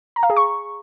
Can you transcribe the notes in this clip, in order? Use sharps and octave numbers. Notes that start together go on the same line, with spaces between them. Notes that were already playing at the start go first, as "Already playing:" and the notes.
A#5
F5
G#4
C#6